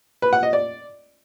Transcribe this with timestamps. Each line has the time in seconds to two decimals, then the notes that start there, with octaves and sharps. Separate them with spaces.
0.22 B4
0.33 F#5
0.43 D#5
0.53 D5